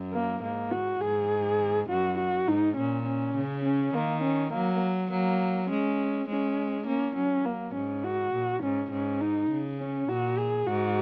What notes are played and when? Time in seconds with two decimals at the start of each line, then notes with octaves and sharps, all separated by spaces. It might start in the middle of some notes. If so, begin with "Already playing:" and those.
Already playing: F#2
0.13 A#3
0.42 G#2 A#3
0.72 F#4
1.01 G#2 G#4
1.89 F#2 F#4
2.19 F#4
2.47 G#2 D#4
2.77 A#2 C#4
3.06 C#4
3.35 C#3
3.64 C#4
3.94 D#3 A#3
4.23 C#4
4.53 F#3 A#3
5.11 F#3 A#3
5.69 G#3 C#4
6.28 G#3 C#4
6.87 A#3 C#4
7.16 F#3 C#4
7.45 A#3
7.74 G#2 C#4
8.04 F#4
8.33 A#2
8.62 G#2 C#4
8.91 G#2 C#4
9.21 D#4
9.50 C#3
9.79 C#4
10.09 A#2 F#4
10.39 G#4
10.67 G#2 F#4